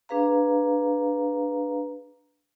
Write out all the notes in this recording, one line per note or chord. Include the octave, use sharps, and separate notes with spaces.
D4 G#4 B4 F5 A#5